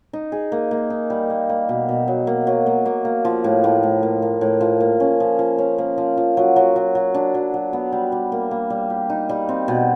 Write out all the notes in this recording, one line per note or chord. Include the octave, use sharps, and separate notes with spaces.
D#4
G#4
A#3
A#3
D#4
G3
A#3
A#3
B2
B2
F#3
A#3
F#3
A#3
A#3
A#3
F3
A2
A2
A2
A#3
A#3
A2
F3
A#3
C#4
F3
F3
C#4
A#3
F3
F3
F#3
F#3
F#3
F#3
D4
F#3
F#3
B3
G3
G3
A#3
A#3
G3
G4
D#4
G3
C4
B2